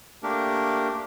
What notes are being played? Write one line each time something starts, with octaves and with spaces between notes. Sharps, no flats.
A3 A#3 D4 G4 A#4